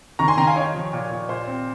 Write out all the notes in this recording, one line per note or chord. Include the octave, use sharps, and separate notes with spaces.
D#3 A#5 C#6
G#5 C6
D#3 G5 A#5
F5 G#5
D#4 C#5
F3
A#2
A#2
A#2 C5
C4